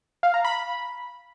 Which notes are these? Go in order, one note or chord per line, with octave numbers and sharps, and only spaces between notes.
F5
A#5
B5